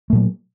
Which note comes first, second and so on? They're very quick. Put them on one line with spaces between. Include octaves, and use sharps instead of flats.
A3 A#2 F#3